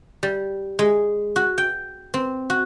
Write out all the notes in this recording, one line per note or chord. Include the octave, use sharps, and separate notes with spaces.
G3
G#3
F#4
G5
C4
F#4